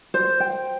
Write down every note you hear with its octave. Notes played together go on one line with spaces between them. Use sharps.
C5
G5